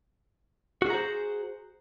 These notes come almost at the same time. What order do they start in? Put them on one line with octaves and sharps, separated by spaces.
F#4 G#4 A#5 C5